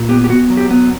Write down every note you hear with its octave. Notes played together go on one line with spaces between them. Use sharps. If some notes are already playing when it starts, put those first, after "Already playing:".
Already playing: A#2
B3 G4
G4
B3 F#4
F#3
G4
B3